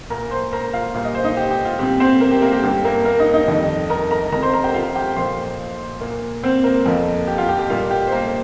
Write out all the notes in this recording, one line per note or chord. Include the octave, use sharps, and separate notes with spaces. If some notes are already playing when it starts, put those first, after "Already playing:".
A#2 A#3 A#4 A#5
C5 C6
A#4 A#5
F4 F5
A#2 G3 A#3 F5
D#5
C5
D#4 D#5
G4
G4
F4
A#2 G3 C4 G4
C4 C5
A#3 A#4
G4
A#3 A#4
G4
G2 G3 A#3 G4
A#3 A#4
A#3 A#4
D#4 D#5
D#4 D#5
F2 D#3 G3
A#4 A#5
A#4 A#5
F2 F3 C4 A#4 A#5
C5 C6
A#4 A#5
G4 G5
F4 F5
G4 G5
A#2 F3 A#3 C5 C6
A#2 A#3
C4 C5
A#3 A#4
F2 F3 A#3
G4
F4
G4
G4
A#2 G3 A#3 F4
G4
C5
A#3 A#4